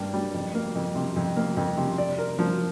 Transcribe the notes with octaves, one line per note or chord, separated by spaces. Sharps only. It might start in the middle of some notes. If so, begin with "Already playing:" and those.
Already playing: G2 A#3
G3
F2
A#3
F2
C3
F2
A#3
F2
C3
D5
A#4
F3